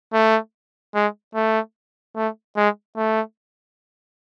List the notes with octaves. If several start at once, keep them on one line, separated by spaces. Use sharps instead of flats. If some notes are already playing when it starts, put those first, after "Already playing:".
A3
G#3
A3
A3
G#3
A3